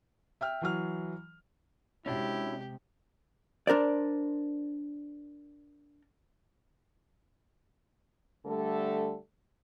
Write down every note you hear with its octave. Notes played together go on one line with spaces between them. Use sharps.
E5 G5 F6
E3 F#3 F6
C3 G#3 C#4 D4 E4 F#4 G4
D4 A#4 C5 D5
D3 G3 A3 A4